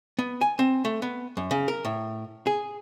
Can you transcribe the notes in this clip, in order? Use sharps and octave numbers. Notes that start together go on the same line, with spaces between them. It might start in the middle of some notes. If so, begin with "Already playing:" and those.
B3
G#5
C4
A3
B3
F#2
C#3
A#4
A2
G#4